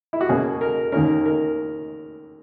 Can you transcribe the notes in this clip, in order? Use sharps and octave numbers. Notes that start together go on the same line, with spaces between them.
E4
F#4
B2 A#3 C#4 G#4
A#4
D#2 D#3 A#3 C#4 A#4
A#4